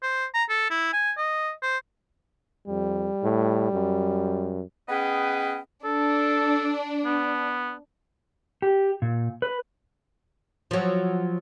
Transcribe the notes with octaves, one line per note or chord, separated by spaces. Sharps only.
C5
A#5
A4
E4
G#5
D#5
C5
F2 G3
A2
F#2
B3 C#4 G#4 B4 D#5 G5
D4 A4
B3
G4
A#2
B4
F3 F#3